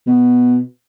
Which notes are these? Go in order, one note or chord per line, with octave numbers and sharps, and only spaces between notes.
B2